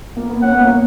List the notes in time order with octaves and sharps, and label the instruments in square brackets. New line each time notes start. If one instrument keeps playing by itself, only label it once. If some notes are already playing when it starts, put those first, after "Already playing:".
[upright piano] A#3
B3
[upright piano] A#3 C#4 [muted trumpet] F#5
[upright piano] B3
A#3 C#4